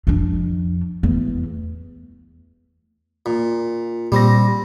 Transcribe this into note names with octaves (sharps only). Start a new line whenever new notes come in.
F2 D4
E2 A3
A#2
A#2 G3 C4 A#6